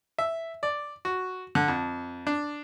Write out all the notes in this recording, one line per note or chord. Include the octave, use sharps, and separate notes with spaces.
E5
D5
F#4
D3
F2
D4